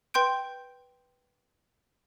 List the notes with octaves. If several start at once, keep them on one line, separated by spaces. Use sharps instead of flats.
B4 G5 C6 G6 D7